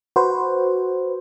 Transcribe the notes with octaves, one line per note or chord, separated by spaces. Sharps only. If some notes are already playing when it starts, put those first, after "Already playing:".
F#4 B4 C5